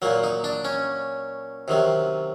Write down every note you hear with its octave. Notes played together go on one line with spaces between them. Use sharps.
A#2 F#3 A#3
D#4
D4
C#4
C3 D#3 F#3